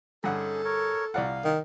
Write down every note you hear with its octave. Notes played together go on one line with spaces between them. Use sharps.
G2 D3 C#4 D#4 G#4 A4 F#5
A#4 C#5
C2 D5 F5 F#5
D#3